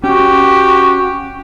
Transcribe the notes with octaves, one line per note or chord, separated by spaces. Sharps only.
C#4 F#4 G4